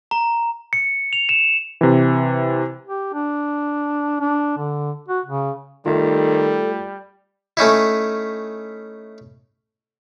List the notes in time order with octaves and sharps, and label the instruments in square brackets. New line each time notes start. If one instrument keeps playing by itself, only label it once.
[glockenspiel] A#5
C#7
F7
E7
[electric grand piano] C3 E3
[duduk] G4
D4
D4
D3
F#4
C#3
[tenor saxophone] D#3 [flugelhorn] G3 [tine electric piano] A3 F4 [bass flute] A4
[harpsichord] A3 C#4 D#4 E4